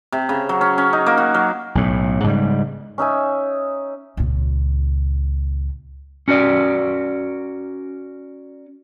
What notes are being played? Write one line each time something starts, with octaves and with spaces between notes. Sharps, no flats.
C3
C#3
F#3
C#4
C#4
D#4
A#3
F#4
F#3
B1 A2
G#2 C#3 G3
C#4 D#4 E5 G#5
C#2 A#2
C#4 F#4 A#4 D5